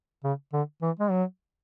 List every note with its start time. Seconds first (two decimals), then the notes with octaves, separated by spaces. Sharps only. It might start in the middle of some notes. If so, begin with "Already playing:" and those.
0.24 C#3
0.53 D3
0.82 E3
0.99 G#3
1.10 F#3